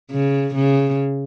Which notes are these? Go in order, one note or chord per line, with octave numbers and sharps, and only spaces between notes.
C#3
C#3